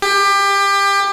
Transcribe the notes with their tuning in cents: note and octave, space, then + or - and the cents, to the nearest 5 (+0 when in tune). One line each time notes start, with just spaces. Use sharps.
G4 +25